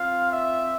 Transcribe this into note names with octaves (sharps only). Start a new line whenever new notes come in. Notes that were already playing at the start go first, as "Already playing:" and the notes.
Already playing: C4 F4 F5
E5